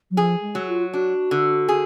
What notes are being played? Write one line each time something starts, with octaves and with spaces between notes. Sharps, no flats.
F#3
F3 G#4
G#3
F#3
F4
D4 F#4
D3
G#4